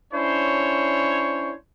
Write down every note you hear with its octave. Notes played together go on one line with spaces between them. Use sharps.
C#4 D4 E4 C5 C#5